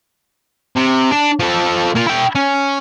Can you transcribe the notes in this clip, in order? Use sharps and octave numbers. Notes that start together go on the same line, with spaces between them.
C3
D4
F3 A4
A#3 F4
E4 G5
C#4